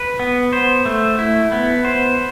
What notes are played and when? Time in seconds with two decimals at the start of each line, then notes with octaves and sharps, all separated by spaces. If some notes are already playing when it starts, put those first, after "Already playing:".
Already playing: B4
0.20 B3
0.53 C5
0.86 A3
1.19 E4
1.52 B3
1.85 C5